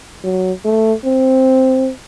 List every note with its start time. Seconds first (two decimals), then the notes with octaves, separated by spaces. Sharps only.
0.24 F#3
0.65 A3
1.05 C4